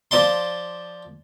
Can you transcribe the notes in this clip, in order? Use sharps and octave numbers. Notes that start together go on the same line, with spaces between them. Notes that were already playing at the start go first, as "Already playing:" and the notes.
F3 D5 A5 C6